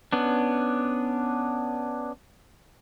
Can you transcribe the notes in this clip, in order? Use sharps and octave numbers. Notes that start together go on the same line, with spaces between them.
B3 C#4 D4